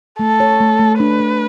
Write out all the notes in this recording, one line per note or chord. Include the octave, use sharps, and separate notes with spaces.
A3 A4
C#5
A3
A3
D4 B4
D4